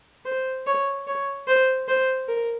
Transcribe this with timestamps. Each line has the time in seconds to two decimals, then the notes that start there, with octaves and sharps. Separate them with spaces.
0.25 C5
0.66 C#5
1.07 C#5
1.47 C5
1.88 C5
2.28 A#4